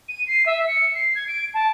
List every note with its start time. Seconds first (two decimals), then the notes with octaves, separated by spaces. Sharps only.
0.08 D#7
0.28 C7
0.46 E5
0.67 C#7
0.95 C7
1.15 G#6
1.28 D7
1.54 A5